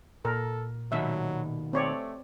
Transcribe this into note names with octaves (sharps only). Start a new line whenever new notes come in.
A#2 A4 A#4
D#2 B2 D#3 F#3 E5
A3 C4 C#5 D5